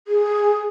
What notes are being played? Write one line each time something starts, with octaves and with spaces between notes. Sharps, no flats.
G#4